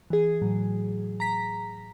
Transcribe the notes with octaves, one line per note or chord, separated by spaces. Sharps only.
E3 G#4
A2 F#3
A#5 B6